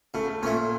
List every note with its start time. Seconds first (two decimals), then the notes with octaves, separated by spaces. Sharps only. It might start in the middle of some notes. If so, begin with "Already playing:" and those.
0.14 C#3 A3
0.42 A#2 A3 C#4